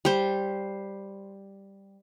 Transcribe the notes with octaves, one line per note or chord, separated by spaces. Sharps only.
G3 C5